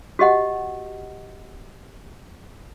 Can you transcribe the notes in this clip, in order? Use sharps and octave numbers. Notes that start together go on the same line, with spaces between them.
F#4 G4 D#5 F#5